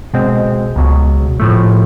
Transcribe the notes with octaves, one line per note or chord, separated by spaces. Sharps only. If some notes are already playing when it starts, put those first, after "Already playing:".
B2 G#3 C4
C#2 B2 F#3
A2 F3 A3